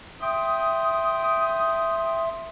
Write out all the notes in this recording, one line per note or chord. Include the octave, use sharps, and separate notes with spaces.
E5 G5 C6 D#6